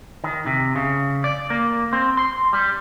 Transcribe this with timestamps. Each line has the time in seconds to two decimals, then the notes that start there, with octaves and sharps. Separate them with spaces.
0.24 D#3
0.46 C3
0.76 C#3
1.24 D5
1.50 A#3
1.93 C4
2.17 C6
2.53 G3